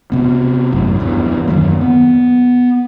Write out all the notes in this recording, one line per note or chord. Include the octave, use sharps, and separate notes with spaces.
C3 B3
G#1 F#2 A2
E2 G2
F#2 D#3 F#3 A#3
B3